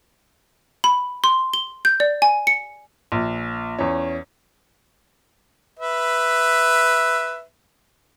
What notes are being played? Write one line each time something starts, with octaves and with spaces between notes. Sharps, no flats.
B5
C6
G7
G6
D5
G#5
C#7
A#1
E2 C#4
B4 E5